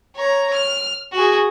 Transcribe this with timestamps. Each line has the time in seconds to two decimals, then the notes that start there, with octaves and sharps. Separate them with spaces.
0.15 C#5 A#5
0.53 F6
1.12 F#4 G#4